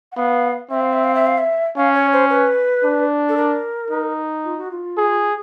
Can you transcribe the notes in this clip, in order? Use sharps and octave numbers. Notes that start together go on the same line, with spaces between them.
F#5
B3 F5
C4 E5
F5
E5
F5
E5
F5
E5
C#4 F5
C#5
C5
B4
D4
A4
A#4
D#4
F4
F#4
F4
G#4